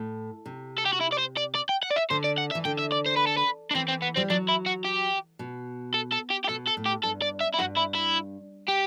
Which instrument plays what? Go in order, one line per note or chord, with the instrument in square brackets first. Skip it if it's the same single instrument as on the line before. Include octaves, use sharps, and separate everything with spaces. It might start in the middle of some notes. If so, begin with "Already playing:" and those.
Already playing: [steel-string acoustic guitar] A2
C3
[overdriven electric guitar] A4
G4
F#4
E4
D5
C5
D5
D5
G5
F#5
D5
E5
[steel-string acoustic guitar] D3 [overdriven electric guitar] C5
[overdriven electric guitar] D5
F#5
E5
[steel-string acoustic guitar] E3
[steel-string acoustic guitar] D3 [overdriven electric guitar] G5
[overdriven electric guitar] E5
D5
C5
B4
A4
B4
D4
[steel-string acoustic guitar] E3 [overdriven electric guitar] C4
[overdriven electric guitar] C4
B3
[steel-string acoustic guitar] G3 [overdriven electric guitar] C4
[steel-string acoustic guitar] F#3 [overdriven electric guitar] D4
[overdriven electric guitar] E4
F#4
G4
[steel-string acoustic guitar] B2
[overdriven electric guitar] A4
A4
G4
G4
[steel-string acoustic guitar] B2 [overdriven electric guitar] A4
[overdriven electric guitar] A4
[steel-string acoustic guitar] A2
[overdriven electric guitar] G4
[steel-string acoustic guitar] G2 [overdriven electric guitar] A4
[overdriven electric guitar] D5
E5
E4
[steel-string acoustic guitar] G2 [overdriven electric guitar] F#4
[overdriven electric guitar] E4
E4
G4